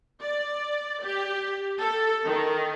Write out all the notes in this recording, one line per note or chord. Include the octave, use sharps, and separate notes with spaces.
D5
G4
A4
D#3